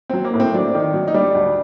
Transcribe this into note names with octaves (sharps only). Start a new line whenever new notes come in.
F#3 C4
A#3
A2
C4
F#3 D4
D#3
F#3
D#4
G3 D4
D2